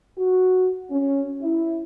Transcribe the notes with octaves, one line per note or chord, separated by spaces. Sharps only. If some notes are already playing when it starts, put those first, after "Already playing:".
F#4
C#4
E4